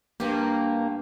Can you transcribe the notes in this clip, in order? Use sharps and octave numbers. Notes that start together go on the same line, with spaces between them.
G2 A#3 G4